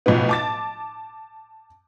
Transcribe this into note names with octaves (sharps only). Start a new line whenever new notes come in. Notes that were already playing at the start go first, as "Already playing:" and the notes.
B1 A2 F3 F#3 B3
A5 D6 A6